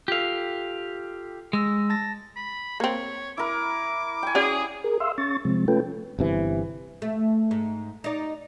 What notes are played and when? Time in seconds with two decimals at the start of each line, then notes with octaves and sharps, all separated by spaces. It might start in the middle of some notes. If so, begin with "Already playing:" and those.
0.08 F4 G4 A4 F5
1.53 G#3 E6 A#6
1.90 A5 A6 A#6
2.36 B5
2.80 A#3 C4 C#5
3.38 E4 A#4 D6
4.23 G5 G#5
4.35 C#4 F#4 G#4 D5
4.84 G#4 A#4
5.00 E5 F5 C6 E6
5.18 C#4 C#6 A6
5.45 C3 F3 G#3 C4
5.68 A3 C#4 F4 A4 B4 G5
6.19 G1 C3 E3
7.02 A3
7.51 G#2
8.04 D#4 D5